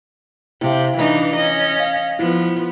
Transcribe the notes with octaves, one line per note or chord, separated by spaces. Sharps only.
C3 E4 F5
E3 D4 D#4
C#4 D#5
F5 A#6
F3 B3 E4